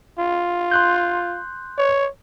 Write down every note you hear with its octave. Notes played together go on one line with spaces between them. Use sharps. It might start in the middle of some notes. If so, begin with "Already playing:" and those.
F4
C6 F#6 G6
C#5